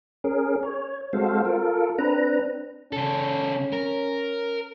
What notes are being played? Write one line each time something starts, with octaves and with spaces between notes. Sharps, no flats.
C#4 G#4 A#4
C#5
G#3 C4 F#4 A4 C5 F5
F4 A4 A#4
C4 D4 B4 A#5
C#3 C#4 A4
A#4